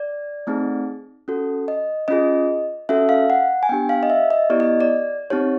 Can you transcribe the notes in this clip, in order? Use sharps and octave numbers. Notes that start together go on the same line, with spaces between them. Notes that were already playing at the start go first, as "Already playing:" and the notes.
Already playing: D5
A3 C4 D#4 G#4
C#4 F#4 A4
D#5
C#4 F4 G#4 D#5
C#4 F#4 A4 E5
F5
F#5
G#5
B3 D4 G4 G5
F5
D#5
E5
D#5
B3 E4 G4 D5
D#5
D5
C4 D#4 G4 C#5